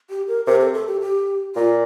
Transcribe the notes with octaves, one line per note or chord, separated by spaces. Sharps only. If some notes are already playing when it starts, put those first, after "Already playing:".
G4
A#4
C3 A#4
A4
A4
G4
G4
A#2 F4